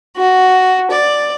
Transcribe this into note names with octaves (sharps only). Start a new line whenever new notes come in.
F#4
D5